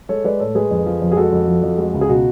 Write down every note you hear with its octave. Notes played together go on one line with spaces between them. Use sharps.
G#3 A4 C#5
G#3 B4 D5
A2 A4 C#5
G#3 G#4 B4
F2
F3
F2
G#4
G#3 F#4 A4
F2
F3
F2
G#3 F#4
C#2
G#4
B2 F#4